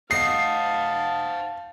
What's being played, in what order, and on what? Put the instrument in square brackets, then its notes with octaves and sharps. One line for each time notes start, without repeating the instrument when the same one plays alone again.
[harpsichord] D#4 A#5 [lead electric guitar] C5 F#5 [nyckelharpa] F5 A5 [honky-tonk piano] C7